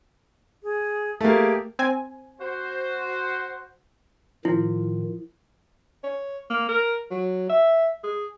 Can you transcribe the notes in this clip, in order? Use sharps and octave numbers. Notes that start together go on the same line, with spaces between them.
G#4
A3 A#3 G4 G#4 F5
C4 G#5
F#4 C5
A2 D#3 F3 E4
C#5
A#3
A#4
F#3
E5
G#4